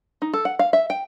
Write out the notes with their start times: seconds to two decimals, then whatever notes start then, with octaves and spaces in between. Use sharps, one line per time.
0.22 D#4
0.34 A4
0.45 F#5
0.59 F5
0.73 E5
0.90 G5